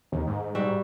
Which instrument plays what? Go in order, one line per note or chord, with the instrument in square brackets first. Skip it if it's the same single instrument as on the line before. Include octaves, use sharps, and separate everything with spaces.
[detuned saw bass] D#2
G#2
[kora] G3 F#4 E5